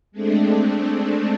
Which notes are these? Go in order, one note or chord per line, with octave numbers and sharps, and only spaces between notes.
G#3 A3 C4 D4